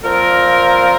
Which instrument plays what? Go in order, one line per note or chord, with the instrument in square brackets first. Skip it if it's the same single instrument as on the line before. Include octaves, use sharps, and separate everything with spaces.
[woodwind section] A#2 F3 C4 F4 A#4